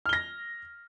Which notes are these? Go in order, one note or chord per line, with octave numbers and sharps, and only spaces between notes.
F6 A#6 G7